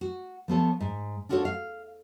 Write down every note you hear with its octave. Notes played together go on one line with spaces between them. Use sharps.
F#4
F3 B3 A4 C#5
G#2
D4 F4 F#4 A4 B4 C#5
F5